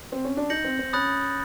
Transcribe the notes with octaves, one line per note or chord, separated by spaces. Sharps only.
C4
C#4
D4
D#4 G6 A#6 C#7 F#7
C4
C4
C#4 B5 D#6 F#6 A6